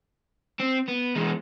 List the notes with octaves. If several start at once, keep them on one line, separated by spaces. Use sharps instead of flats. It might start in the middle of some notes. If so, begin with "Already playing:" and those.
C4
B3
E2 G#3